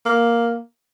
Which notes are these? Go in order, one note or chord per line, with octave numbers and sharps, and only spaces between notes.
A#3